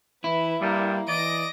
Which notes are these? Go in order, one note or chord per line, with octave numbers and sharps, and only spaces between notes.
E3 E4 B4
G2 A#2 G3 A#3
E3 D5 D#5 A#6 D7